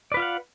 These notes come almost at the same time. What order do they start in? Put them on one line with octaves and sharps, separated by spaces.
D5 B4 F4 F5 F#5